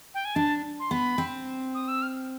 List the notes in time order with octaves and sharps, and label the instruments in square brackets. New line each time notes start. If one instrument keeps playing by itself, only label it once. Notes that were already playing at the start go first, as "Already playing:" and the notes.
[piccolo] G5
G#5
[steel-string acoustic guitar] D4 [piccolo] A5
[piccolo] C6
[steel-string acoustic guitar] B3 [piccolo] B5
[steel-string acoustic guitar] C4
[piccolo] D#6
E6
F6